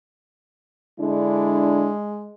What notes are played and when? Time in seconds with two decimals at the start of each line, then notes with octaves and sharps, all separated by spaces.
1.00 D3 G#3 D4 E4